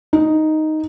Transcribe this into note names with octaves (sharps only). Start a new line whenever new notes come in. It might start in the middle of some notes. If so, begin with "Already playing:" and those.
D#4